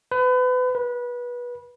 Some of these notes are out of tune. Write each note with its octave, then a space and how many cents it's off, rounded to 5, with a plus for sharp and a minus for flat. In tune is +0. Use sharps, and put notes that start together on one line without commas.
B4 +30
B4 -25